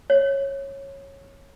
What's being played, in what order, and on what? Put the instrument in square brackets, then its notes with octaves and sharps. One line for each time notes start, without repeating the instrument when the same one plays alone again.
[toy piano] C#5